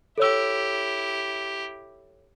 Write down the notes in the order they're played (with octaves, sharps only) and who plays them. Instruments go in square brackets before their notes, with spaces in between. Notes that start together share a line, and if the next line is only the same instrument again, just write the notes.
[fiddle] E4 G4 [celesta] A4 C#5 E6